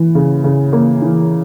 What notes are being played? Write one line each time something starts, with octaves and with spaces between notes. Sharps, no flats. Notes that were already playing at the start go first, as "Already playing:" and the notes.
Already playing: E3
C#3
C#3
A#3
E3